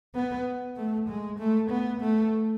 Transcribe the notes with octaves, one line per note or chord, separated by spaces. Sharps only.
B3
A3
G#3
A3
B3
A3